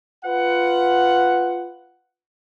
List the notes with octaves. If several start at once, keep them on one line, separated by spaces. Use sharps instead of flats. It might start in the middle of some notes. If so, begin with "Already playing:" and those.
F4 B4 F#5